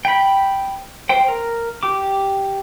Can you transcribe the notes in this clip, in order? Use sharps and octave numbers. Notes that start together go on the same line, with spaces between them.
G5 B5
C5 G5
A#4
G4 D6